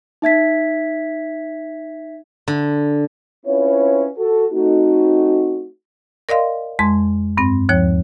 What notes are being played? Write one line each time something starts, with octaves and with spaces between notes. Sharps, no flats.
D#4 E5 G#6 B6
D3
C4 C#4 E4 F4 B4 C#5
F#4 A4
A3 C4 D#4 F#4
A#4 D5 D#5 F5 C6
F2 G#3 C6
G2 C4
D#2 F3 C#5